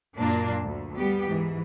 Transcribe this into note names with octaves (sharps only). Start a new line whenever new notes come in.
F#2 A#2 A#3 D4
D2
G3 B3 G4
G#2 E3